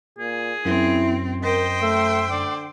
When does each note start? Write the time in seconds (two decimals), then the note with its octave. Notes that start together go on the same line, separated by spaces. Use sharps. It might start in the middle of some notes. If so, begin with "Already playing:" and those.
0.19 A#2 G#4
0.65 F#2 C4 E4
1.43 A#4 C5 D#5 G5
1.82 A3 E5
2.31 D3 D5